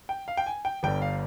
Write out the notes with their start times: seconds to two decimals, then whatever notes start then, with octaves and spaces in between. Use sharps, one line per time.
0.09 G5
0.28 F5
0.37 G5
0.46 G#5
0.65 G5
0.83 G1 G2 D3 G5
1.02 F5